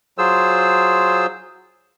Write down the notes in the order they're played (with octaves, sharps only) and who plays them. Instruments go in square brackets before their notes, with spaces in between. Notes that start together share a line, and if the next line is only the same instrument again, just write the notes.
[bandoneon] F#3 F4 G#4 C5 E6